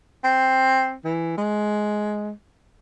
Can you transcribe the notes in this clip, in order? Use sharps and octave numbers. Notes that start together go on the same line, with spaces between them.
C4
E3
G#3